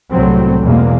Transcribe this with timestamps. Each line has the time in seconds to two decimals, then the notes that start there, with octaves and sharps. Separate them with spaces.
0.11 C2 A2 F#3 C4
0.62 E2 B2 G#3 A#3